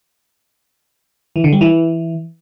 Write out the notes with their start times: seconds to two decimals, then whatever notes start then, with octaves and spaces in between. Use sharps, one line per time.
1.36 E3
1.44 D3
1.53 G3
1.61 E3